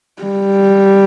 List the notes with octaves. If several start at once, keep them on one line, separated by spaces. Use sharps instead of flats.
G3